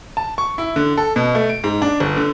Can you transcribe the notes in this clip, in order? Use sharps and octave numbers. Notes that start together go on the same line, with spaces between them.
A5
C#6
E4
D3
A4
B2
A3
D7
G#2
D4
G1
D3